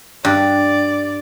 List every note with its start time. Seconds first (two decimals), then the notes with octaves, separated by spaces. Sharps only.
0.25 G2 D5